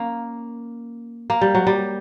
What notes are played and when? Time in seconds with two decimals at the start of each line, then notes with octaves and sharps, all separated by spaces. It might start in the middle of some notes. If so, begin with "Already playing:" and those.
Already playing: A#3 C#4
1.30 A#3
1.41 G3
1.55 F#3
1.67 G3